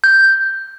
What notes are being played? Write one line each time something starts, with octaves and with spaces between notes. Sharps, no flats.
G6